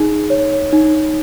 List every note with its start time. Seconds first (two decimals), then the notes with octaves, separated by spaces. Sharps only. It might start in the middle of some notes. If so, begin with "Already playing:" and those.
Already playing: D#4 G#4
0.30 C#5
0.72 D#4